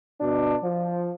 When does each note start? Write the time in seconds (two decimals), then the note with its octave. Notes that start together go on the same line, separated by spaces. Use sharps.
0.21 B2 D4
0.63 F3